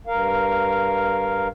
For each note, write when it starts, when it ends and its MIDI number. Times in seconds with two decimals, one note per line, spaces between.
0.07 1.48 43
0.07 1.48 70
0.07 1.48 77